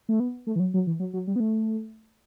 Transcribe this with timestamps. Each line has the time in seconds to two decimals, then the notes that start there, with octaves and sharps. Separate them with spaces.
0.09 A3
0.20 B3
0.47 A3
0.56 E3
0.60 F#3
0.74 F#3
0.87 E3
1.00 F#3
1.13 F#3
1.27 G3
1.36 B3
1.40 A3